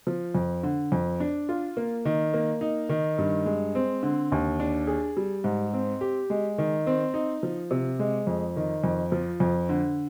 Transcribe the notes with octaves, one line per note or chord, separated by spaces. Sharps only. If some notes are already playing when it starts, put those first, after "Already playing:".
F3
F2
D3
F2
D4
F4
A#3
D#3
A#3
D#4
D#3
G2
G#3
C4
D3
D#2
D4
G#4
G3
G#2
C4
G4
G#3
D#3
C4
D#4
F3
C3
G#3
F2
D#3
F2
F3
F2
D3